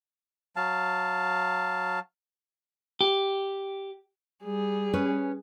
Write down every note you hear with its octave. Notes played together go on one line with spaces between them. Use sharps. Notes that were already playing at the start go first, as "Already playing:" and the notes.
F#3 F5 A5
G4
G3 G#4
C#4 B4 C#5